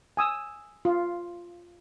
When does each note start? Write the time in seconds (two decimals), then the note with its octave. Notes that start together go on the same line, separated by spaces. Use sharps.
0.17 G#5 D#6 E6
0.85 F4